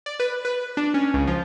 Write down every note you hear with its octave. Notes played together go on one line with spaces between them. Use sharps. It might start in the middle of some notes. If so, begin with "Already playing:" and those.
D5
B4
B4
D4
C#4
C#2
F3